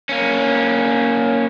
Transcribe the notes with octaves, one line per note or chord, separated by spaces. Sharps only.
A#3 C#4